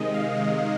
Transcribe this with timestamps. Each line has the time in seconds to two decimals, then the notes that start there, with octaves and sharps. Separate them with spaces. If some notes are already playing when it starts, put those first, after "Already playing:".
Already playing: C3 D#3 G#3 D#5
0.14 F5